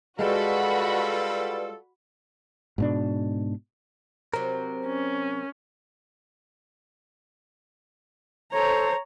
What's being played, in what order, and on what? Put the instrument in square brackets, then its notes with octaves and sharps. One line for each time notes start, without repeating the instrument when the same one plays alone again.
[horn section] G3 F4 A4 [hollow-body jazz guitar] G#3 [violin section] F#4 B5 [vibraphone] B4 D5
[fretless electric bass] G#2 B2 D4
[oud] C3 F#3 [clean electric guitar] A#4
[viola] C#4
[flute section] A4 C5 [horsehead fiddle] C#5 A#5